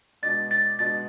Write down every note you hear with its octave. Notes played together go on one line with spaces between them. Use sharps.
B2 G#3 D4 A6
A6
B2 G#3 D4 A6